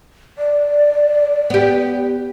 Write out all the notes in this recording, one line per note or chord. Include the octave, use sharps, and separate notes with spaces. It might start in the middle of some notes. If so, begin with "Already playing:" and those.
D5
B3 G4